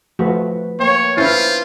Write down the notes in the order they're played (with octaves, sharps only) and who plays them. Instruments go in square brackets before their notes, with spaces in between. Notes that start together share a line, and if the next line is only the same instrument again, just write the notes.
[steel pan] F3 A3 F#4 [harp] B4
[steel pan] A#3 [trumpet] C#5 [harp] G5
[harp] C#4 D4 B4 [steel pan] E4 [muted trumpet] F4 [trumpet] C5